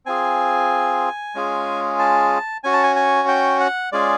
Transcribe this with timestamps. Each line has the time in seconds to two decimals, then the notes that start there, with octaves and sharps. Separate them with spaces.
0.06 C4 F4 G#4 G#5
1.35 G#3 C#4 F4 G#4
1.99 A5
2.64 C#4 F#4 G#5
2.73 A5
2.83 G#5
2.96 G#5
3.28 G5
3.60 F#5
3.92 G#3 C#4 F4 G#4 D5